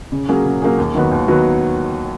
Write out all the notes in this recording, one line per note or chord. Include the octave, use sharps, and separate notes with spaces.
C#3
F#3 A#3 C#4 G#4
C#3
F#3 A#3 C#4 G#4
D#2
D#3 F#3 B3 F#4
D#2
D#3 F#3 B3 F#4